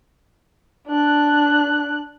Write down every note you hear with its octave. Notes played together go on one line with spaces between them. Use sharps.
D4 F#6